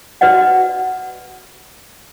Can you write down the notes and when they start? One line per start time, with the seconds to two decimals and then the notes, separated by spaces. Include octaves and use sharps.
0.21 F#4 B4 D5 D#5 F#5